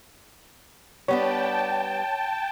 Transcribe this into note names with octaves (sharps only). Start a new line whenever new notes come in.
G3 B3 D4 C#5 G5 A5